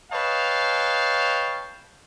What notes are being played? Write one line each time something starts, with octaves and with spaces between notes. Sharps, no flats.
B4 C#5 D#5 F5 G5 A5